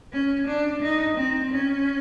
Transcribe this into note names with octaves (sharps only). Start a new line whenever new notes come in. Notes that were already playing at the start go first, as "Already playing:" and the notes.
C#4
D4
D#4
C4
C#4